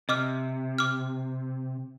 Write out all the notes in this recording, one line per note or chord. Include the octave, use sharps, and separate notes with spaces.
C3 D#5 D6 F6
D6 F6